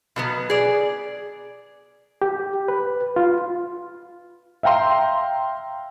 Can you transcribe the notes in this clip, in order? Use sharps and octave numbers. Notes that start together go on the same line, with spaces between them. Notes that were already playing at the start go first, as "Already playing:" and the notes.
B2 F#3 B3
G#4 D5
G4
B4
F4
E5 F5 G5 A#5 C6